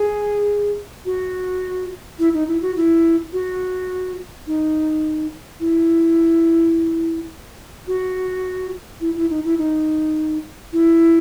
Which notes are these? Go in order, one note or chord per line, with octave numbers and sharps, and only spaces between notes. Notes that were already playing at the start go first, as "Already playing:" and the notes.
Already playing: G#4
F#4
E4
D#4
E4
F#4
E4
F#4
D#4
E4
F#4
E4
E4
D#4
E4
D#4
E4